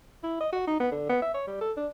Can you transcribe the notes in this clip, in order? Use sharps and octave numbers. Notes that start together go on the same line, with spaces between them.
E4
D#5
F#4
D#4
B3
D3
B3
E5
C#5
G3
A4
D4